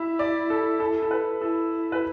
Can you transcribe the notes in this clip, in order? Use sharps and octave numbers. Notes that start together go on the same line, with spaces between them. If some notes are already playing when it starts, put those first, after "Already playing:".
Already playing: E4 E5
D5
A4
A4
A4
B4
E4 A4
B4